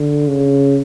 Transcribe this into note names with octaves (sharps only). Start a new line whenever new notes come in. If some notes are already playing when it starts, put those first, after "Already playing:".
Already playing: D3
C#3